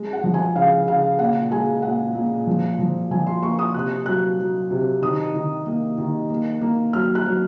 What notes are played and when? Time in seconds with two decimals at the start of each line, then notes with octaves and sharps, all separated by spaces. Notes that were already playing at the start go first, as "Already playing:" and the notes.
Already playing: G#3
0.13 F#5
0.24 F3
0.34 G#5
0.56 C#3 F5
0.88 C#3 F5
1.19 A#2 F#5
1.51 G#3 G#5
1.82 A#2 F#5
2.15 A#2
2.47 F3
2.79 F3
3.11 F3 G#5
3.27 C6
3.42 A#3 C#6
3.59 D#6
3.74 C3 F#6
4.06 F#3 F#6
4.39 F#3
4.71 C3
5.02 D#3 D#6
5.34 D#3
5.66 A#3
5.98 D#3
6.30 A#3
6.61 A#3
6.93 F#3 F6
7.15 F#6
7.26 F#3